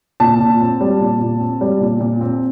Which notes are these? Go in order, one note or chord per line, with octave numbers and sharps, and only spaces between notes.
A#2 A5
A#2
C4
G3
A#2
A#2
C4
G3
A#2
A#2
C4